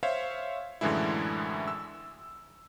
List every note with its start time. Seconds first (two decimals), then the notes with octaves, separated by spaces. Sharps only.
0.03 C5 C#5 E5 F5
0.81 F#2 A2 D3 E3 G#3 E4
1.67 E6